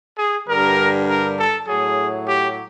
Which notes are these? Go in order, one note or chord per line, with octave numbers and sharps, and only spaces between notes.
G#4
G2 D3 G3 A#4
A#4
A4
A2 F#3 G#4
G4